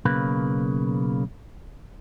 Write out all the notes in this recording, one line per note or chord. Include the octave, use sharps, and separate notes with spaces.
B1 C#3 A#3 B4